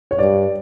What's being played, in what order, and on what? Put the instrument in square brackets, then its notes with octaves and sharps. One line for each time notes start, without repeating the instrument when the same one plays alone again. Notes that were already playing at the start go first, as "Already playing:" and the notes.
[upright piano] C#5
[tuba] G2 [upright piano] D5